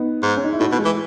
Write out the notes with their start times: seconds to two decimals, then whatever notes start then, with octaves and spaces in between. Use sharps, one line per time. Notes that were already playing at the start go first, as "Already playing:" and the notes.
Already playing: B3 D#4
0.23 G#2
0.37 C#4
0.44 D#4
0.53 E4
0.60 A2 D#4 F#4
0.72 B2
0.79 G#3
0.85 E3